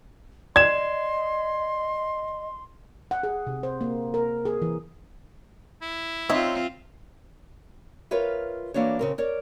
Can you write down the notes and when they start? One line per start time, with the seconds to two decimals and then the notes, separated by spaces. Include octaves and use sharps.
0.56 D5 D#5 C6 G#6 E7
3.11 F#5
3.23 G#4
3.47 C3
3.63 C5
3.81 A#3
4.14 A#4
4.45 G#4
4.62 E3
5.82 E4
6.29 C4 D#4 F4 C#5 E5
8.11 F4 A#4 B4 C#5 E5
8.74 E3 A#3 D4 F#4 C#5
8.99 C#3 C4 A#4
9.18 A#4 C#5 D5